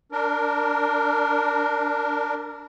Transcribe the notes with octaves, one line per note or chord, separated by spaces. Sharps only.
D4 A#4